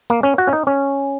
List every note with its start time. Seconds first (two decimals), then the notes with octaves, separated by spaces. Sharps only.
0.10 A#3
0.23 C#4
0.38 F#4
0.47 C#4
0.53 D#4
0.67 C#4